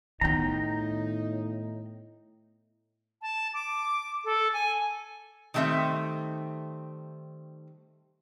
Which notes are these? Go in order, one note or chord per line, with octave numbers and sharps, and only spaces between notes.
A2 D#3 B3 D#4 G5 A#5
A5
D6
A4
G#5
D#3 G3 A3 C4 E5